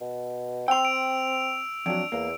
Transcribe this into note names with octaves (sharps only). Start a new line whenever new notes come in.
B2
C4 G5 C6 E6 F7
D7
F2 F#3 D4 D7
E2 A#3